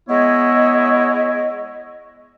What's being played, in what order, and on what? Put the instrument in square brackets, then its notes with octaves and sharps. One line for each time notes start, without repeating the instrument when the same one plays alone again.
[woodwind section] G#3 B3 E4 C#5 D#5